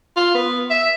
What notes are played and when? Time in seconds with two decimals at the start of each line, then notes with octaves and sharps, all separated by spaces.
0.17 F4
0.35 B3
0.70 E5